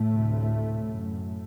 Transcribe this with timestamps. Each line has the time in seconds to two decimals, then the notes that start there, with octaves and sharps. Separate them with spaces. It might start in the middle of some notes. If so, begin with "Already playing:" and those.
Already playing: A2 A3
0.09 D2 C3
0.86 F#2